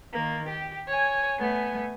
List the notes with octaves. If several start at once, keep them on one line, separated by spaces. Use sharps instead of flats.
D#3 A#3
G4
C#5 G#5
A3 B3 G#5